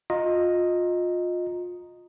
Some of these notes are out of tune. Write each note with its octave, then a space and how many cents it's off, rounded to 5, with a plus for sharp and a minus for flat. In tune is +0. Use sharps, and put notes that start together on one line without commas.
F4 +30 D#5 +0 A#5 +0